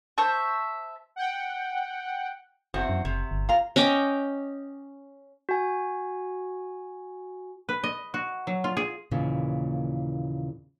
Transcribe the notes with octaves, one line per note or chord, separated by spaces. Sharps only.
C5 E5 A5 C#6
F#5 G5
F#1 E2 C4 F#4
F#2
F#1 C3
G1
F4 A#5
C#4 D#5 G5 D6
F#4 G#5
B4
D#5
F#4
F#3
F4
G#4
D#2 A#2 C#3 E3